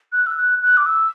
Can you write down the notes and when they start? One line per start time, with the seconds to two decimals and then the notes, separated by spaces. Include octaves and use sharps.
0.12 F#6
0.27 E6
0.37 F#6
0.62 F#6
0.77 D6
0.86 E6